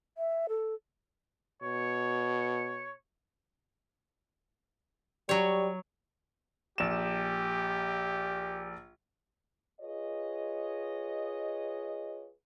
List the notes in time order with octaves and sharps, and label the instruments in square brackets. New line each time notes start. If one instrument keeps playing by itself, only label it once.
[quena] E5
A4
[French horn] B2 [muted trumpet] C#5
[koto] F#3 C#5 [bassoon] G3
[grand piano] A#1 E7 [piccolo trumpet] G4
[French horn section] F4 G#4 B4 C#5 D#5